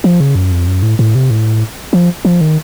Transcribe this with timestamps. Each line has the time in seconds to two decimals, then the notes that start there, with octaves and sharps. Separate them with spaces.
0.04 F3
0.20 C#3
0.35 F#2
0.52 F2
0.67 F#2
0.83 A2
0.99 A2
1.15 C3
1.30 A2
1.93 F3
2.25 F3
2.41 D#3